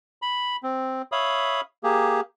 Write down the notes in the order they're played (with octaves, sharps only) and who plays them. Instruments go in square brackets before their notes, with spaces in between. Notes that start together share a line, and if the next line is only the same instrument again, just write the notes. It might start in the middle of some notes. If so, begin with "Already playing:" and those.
[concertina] B5
C4
C#5 E5 F5 B5 D#6
A#3 G4 G#4